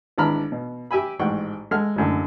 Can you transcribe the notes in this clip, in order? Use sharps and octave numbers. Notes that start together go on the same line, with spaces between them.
G#1 E3 D4 A#5 B5 F6
B2
G4 E5 G#5 B5
A1 G#2 F#5 G5 C#6
G#3 A4 F#5 F6
A1 F#2 D3